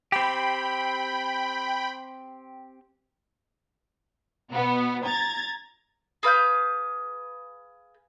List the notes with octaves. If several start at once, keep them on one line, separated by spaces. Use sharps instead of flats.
C4 G4 G5 B5
B2 B3
A#5 G#6 A6
G#4 B4 F5 G6